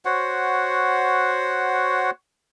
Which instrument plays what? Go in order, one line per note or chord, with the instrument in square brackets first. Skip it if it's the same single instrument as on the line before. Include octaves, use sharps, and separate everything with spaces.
[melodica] F#4 C5 C#5 F#5